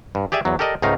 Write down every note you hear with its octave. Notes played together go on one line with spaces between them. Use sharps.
G2
G4 G#4 D5 E5 G#5
E2 F#3
G4 A4 A#4 D5 D#5
C#2 G#2 A3 D#4 A#4 F5